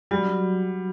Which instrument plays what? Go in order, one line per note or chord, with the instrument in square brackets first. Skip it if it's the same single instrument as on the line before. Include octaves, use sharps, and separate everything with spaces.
[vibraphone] F#3 F#4 [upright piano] G3